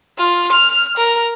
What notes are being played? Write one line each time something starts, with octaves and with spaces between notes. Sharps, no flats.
F4
F6
A#4